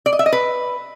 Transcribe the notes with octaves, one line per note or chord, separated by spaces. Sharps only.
D5
D#5
E5
D#5
B4